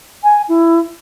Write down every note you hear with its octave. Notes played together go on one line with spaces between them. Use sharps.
G#5
E4